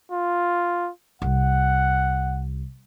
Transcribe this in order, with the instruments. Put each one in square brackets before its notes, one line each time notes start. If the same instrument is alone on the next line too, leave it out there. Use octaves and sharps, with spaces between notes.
[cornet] F4
[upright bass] C2 [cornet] F#5